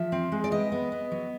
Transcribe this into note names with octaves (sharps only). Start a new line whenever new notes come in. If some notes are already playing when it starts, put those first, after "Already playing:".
Already playing: F3 E5
C4
G#3
D5
B3 D#5
B3
B3
F#3